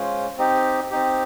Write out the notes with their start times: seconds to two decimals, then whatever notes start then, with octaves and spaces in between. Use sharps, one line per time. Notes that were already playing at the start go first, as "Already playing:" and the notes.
Already playing: G#3 C#4 F4 C5
0.38 C4 D#4 G4
0.91 C4 D#4 G4